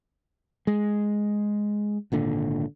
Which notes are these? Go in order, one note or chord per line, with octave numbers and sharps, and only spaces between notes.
G#3
G#1 A#2 D3